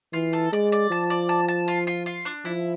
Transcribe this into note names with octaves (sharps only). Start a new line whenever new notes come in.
E3 F4
A4
G#3 D5
D5
F3 A5
D5
A5
A5
F4
F4
F4
D4
F3 E4